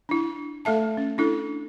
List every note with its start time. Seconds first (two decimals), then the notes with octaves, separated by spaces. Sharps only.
0.09 D4 E4
0.65 A3 A4 E5 A5
0.97 C#4
1.18 D4 E4 A4